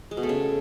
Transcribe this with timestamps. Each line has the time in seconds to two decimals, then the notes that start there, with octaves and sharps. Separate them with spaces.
0.11 G#3
0.17 B2
0.23 A3
0.29 C#3